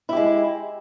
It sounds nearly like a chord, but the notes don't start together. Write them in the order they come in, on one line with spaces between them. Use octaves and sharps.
E4 G4 G#3